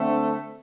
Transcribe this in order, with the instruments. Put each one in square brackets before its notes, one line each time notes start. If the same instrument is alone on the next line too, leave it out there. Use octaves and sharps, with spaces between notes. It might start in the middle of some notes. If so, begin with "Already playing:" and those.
Already playing: [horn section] D3 A3 C4